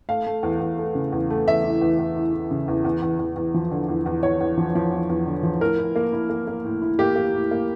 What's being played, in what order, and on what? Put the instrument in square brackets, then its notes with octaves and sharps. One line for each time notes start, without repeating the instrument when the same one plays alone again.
[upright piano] A3 F5
A3
E2
E2
A3
C#3
E2
A3
E2 E5
E3
E2
E2
E3
E3
C#3
E2
E2
E2
E2
E2
F3
D3
E2
E2
E2 C#5
E2
F3
F3
E2
E2
D3
F3
A2 A#4
E4
A#3
E4
A#3
A#3
A2
E4
A#3 G4
A#3
A2
A#3